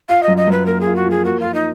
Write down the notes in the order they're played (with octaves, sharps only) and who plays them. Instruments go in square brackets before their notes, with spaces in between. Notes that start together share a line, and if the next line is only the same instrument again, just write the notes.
[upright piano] F4 [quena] F5
[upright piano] F#2 [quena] D#5
[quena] D#5
[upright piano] F#2 [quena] B4
[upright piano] A#3 [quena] A#4
[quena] G#4
[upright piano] F4
[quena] F#4
[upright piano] F3
[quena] G#4
[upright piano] A#3 [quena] F#4
[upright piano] A#3 [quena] F4
[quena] D#4